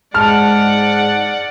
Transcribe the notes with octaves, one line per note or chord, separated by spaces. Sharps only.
G#2 G#3 D5 F#5 A5 F6